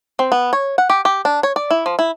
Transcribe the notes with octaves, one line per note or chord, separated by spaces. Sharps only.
C4
B3
C#5
F#5
G4
G4
D4
C#5
D5
E4
F3
E4